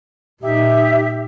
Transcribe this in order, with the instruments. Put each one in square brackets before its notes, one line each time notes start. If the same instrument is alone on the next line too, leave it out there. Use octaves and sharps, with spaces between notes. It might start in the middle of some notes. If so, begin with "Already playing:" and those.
[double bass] A#2 D#4 [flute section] G4 E5